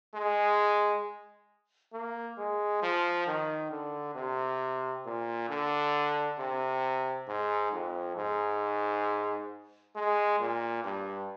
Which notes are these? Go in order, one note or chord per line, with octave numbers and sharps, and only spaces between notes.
G#3
A#3
G#3
F3
D#3
D3
C3
A#2
D3
C3
G#2
F2
G#2
G#3
A#2
G2